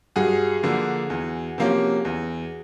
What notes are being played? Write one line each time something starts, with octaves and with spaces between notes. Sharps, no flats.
G2 F#4 G#4
D3 F3 A#3
E2
C3 F3 A#3 C#4
E2